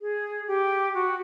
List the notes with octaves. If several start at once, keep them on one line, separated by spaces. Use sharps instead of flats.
G#4
G4
F#4